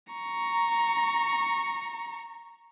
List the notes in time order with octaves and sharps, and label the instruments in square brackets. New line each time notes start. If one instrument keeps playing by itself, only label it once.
[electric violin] A#5 C#6